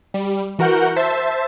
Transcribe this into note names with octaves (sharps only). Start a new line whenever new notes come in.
G3
E3 F#4 A#4 F#5 G6
C5 E5 A5